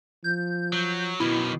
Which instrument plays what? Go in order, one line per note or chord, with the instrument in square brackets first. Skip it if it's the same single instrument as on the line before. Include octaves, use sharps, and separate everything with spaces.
[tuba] F3 [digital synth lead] G6
[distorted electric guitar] F#3
[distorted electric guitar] F#2 D#3 [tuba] B2 [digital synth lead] E4